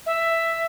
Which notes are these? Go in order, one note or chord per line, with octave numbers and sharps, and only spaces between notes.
E5